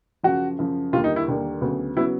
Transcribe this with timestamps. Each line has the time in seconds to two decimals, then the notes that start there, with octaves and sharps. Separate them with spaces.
0.23 F#2 C#3 F3 F#4
0.59 F#2 C#3 F3
0.93 D#2 D3 G3 A#3 F4
1.04 D#4
1.16 E4
1.28 D#2 D3 G3 A#3
1.61 D2 C#3 F#3 B3
1.97 C#3 F#3 B3 E4